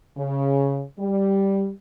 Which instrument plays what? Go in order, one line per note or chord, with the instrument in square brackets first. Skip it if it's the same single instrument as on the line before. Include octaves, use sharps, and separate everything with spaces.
[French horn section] C#3
G3